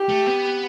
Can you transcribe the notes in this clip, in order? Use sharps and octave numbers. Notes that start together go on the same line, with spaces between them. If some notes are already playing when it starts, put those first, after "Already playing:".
Already playing: G4
A3
B3